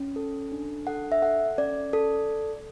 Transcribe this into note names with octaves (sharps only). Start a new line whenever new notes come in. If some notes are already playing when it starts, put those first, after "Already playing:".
Already playing: C#4
A4
D4
A4 F#5
E5
A4 F#5
C#4 D5
A4